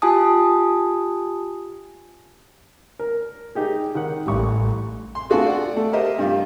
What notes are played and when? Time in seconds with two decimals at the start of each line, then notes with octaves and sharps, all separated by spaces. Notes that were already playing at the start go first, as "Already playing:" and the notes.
0.02 F4 G4 G#5 A5 D#6
2.99 A#4
3.55 D#4 G4 G#4
3.95 D#3 F#5
4.27 A1 G3 C#6
5.15 C6
5.30 A3 D4 F4 F#4 G#4
5.46 D5 F#5
5.76 A3
5.93 G4 A#4 C5 D#5 E5
6.19 G2 G3 F4